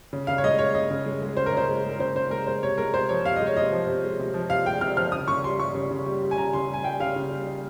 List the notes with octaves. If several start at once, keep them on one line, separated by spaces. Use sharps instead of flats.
C#3
C#3 F5
C#5
G#3 D#5
G#3 C#5
C#3 D#5
C#3
G#3
G#3
C#3 C5
A#4
C#3 C5
G#3
G#3 A#4
C#3 C5
C#3 C5
G#3 A#4
G#3 C5
C3 C#5
G#3 A#4
C3 C5
F3 C#5
C3 F5
G#3 D#5
C#5
C3 D#5
F3
C3
G#3
C3
F3
C3 F5
G#3 G5
C3 F6
F3 F6
C#3 D#6
C#3 C#6
G3 C6
G3 C#6
C#3
C#3
G3
G3
G#5
C#3 A#5
C#3 C6
G3
G#5
G3 G5
C#3 F5
C#3
G3
G3